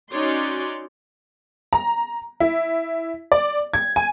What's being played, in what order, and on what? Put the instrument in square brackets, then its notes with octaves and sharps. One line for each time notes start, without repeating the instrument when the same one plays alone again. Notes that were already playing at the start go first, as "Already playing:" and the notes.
[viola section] C#4 D#4 F#4 C#5 D5 C6
[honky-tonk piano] A#5
E4
D5
G#6
G#5